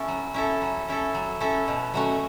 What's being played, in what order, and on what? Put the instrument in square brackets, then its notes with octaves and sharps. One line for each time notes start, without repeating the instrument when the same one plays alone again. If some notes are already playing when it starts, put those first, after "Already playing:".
Already playing: [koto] C#4 E4 A4
F#3
C#4 E4 A4
F#3
C#4 E4 A4
F#3
C#4 E4 A4
B2
F#3 A3 C#4 F#4